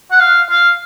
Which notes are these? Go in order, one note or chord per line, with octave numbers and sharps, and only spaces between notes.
F#5
F5
F5